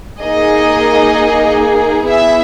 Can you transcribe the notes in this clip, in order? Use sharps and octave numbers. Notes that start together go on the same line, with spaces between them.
A#3 D#4 G#4 D#5
B3 E4 G#4 E5